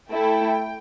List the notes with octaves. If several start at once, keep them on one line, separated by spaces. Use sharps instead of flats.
A3 E4 A4 G5